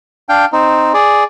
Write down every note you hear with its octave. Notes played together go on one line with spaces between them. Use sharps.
D4 F5 G5
C4 D#4
G#4 D5